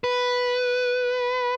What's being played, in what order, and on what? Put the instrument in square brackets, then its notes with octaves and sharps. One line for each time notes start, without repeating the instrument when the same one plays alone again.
[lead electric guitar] B4